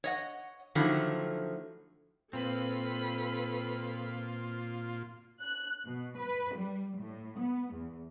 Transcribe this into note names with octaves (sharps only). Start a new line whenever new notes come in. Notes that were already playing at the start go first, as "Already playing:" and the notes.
C#5 D#5 F#5
D3 D#3 F3 F#3 A3 E4
A#2 C4 F4 A4 B4 B5
F#6
B2
B4
G3
A2
B3
E2